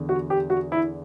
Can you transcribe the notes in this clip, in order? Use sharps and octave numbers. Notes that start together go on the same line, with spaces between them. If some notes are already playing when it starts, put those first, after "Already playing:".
Already playing: E2 D3
F#4
G4
F#4
E4